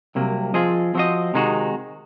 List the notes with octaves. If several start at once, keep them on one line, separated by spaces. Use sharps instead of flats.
C2 C3 F#3 A#3
F3 C4 F4 G#4 D#5
F3 C4 F#4 C5 D#5
C3 D#3 G#3 D#4 F#4